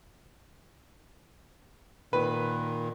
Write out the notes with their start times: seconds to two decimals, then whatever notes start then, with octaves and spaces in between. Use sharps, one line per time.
2.13 A#2 D#3 B4